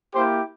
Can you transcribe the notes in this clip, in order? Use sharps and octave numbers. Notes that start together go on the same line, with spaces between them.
A#3 E4 G4 C5